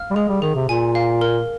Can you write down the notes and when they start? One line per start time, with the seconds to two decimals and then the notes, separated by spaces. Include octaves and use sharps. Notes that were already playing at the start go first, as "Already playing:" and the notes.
Already playing: F5 F6
0.11 G3
0.15 G#3 G#4
0.29 G3
0.42 D#3 G#4
0.55 C3
0.68 A#2 G#5
0.95 F5
1.21 A#4